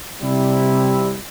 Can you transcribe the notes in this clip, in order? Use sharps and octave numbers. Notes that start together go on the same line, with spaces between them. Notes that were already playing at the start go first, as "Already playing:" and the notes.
C3 G3 E4